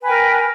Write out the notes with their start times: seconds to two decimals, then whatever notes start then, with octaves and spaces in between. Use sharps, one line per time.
0.01 B4
0.03 G#5
0.06 G5
0.08 A#4